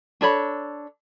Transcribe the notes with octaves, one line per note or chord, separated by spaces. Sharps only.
D4 A4 C#5 B5